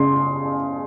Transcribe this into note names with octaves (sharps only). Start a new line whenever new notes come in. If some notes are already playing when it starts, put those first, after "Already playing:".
Already playing: C#3 C6